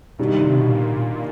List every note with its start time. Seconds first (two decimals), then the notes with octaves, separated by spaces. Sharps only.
0.19 G2 B2 D#3 G3
0.31 C3
0.44 C3
0.56 B2
0.69 A#2